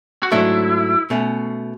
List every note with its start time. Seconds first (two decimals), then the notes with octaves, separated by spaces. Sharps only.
0.23 F#4
0.32 G#2 F#3 A3 D4 E4
1.10 B2 A3 C#4